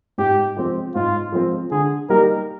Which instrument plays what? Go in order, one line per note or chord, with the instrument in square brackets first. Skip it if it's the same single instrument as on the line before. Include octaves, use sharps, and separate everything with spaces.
[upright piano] G#2 [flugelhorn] G4
[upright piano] F3 G#3 C4
[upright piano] G#2 [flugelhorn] F4
[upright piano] F3 G#3 C4
[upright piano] D3 [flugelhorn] G#4
[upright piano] G3 A#3 D#4 G4 [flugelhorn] A#4